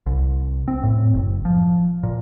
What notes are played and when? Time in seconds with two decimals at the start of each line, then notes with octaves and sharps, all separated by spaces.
0.06 C2
0.68 C4
0.83 A2
1.14 F#1
1.45 F3
2.03 A#2